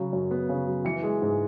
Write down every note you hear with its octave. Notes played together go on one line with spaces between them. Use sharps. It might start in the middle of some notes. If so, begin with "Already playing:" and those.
Already playing: C#3 F#3
F#2
B3
C#3
F#3
E3 C#7
G#3
G#2